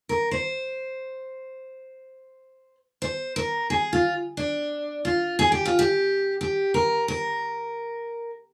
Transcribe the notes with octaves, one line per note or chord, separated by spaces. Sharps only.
A#4
C5
C5
A#4
G#4
F4
D4
F4
G#4
G4
F4
G4
G4
A#4
A#4